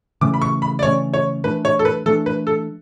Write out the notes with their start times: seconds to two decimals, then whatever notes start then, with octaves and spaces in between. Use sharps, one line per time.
0.21 C#3 E3 A3 C#4 D6
0.34 B5
0.42 C#6
0.62 B5
0.79 D5
0.83 C#3 E3 A3 C#4 C#5
1.14 C#5
1.44 E3 A3 D4 B4
1.65 C#5
1.79 A4
1.85 B4
2.06 E3 A3 D4 A4
2.26 B4
2.47 A4